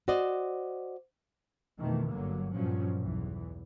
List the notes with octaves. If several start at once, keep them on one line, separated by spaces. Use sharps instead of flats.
F#4 C5 D5 D#5
F2 B2 D#3 E3 A3
G1 G2 D3 F#3 A#3
G2 A#2 F3 F#3 C#4
B1 E2 E3